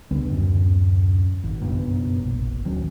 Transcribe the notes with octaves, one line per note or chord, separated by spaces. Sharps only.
C#2 D3 G3 B3
D1 F#2 C#4
G#1
F#1 B1 G2 B3
F1 A#1
D1 D#3 F#3 C#4